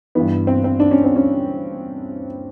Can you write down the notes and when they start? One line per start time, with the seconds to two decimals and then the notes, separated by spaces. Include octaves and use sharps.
0.15 G2 E3 B3
0.47 C4
0.64 C4
0.80 D4
0.91 C#4
1.04 C4
1.16 C#4